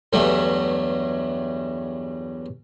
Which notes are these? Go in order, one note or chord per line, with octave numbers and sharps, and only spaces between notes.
E2 G2 F#3 G3 A3